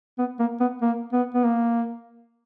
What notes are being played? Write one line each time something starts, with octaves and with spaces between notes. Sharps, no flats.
B3
A#3
B3
A#3
B3
B3
A#3